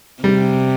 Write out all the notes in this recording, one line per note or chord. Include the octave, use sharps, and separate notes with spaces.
C3 G3